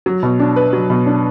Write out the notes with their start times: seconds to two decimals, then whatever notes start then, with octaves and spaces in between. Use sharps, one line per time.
0.06 F#3
0.23 B2
0.40 D4
0.56 B4
0.73 F#3
0.90 B2
1.06 D4